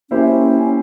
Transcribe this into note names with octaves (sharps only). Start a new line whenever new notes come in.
A#3 C#4 E4 G4 C5